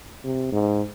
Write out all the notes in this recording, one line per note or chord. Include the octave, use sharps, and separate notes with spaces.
C3
G#2